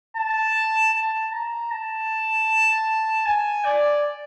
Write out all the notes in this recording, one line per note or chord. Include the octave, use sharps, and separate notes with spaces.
A5
A5
A#5
A5
G#5
D5